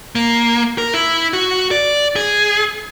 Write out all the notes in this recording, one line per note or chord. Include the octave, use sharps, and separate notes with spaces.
A#3
A#4
E4
F#4
D5
G#4